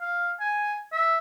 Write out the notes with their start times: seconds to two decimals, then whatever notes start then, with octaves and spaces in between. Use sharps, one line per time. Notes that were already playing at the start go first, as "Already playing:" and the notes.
0.01 F5
0.40 G#5
0.92 E5